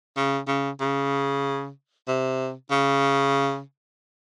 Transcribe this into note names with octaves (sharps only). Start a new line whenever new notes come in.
C#3
C#3
C#3
C3
C#3